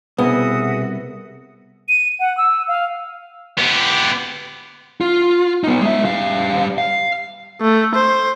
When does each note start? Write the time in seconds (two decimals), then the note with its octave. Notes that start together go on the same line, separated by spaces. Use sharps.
0.18 C2 B2 B3 F#4 G#4 B4 E5 D#6
1.89 D#7
2.20 F#5
2.37 E6
2.68 F5
3.58 B3 G4
5.01 F4
5.64 B3 D#4
5.81 G#3 E5
6.05 G3 F5
6.78 F5
7.62 A3
7.94 C5